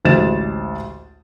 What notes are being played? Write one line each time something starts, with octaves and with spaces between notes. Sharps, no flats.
A1 D2 G#3 C5 A6 E7